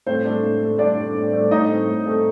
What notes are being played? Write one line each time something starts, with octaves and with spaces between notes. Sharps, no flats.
A2 C4 C5
A3 D4
A2
A3 D4
A2 D4 D5
A3 D4
A2
A3 D4
A2 D#4 D#5
A3 C4
A2
A3 C4